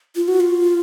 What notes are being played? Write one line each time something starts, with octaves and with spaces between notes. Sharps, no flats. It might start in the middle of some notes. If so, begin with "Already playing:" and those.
F4
F#4
F4